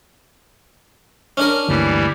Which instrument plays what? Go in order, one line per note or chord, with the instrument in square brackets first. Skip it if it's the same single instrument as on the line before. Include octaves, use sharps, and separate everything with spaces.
[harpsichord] C#4 D4 A#4
[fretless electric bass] G1 D2 A#3 [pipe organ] E3 G3